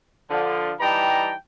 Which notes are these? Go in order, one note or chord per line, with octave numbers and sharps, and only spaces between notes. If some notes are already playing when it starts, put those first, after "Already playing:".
D3 F3
E3 G3 D#4 G5 A5 A#5